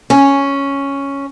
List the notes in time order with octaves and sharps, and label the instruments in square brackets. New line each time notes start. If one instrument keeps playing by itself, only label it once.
[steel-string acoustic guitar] C#4